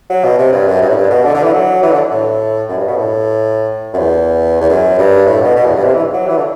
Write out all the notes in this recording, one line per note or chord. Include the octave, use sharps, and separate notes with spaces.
F#3
B2
C3
G2
F#2
G2
A2
G2
B2
D3
D3
E3
F#3
E3
D3
A2
F#2
G2
B2
A2
F#2
E2
E2
F#2
G2
A2
B2
B2
E2
G2
C3
E3
F#3
E3
D3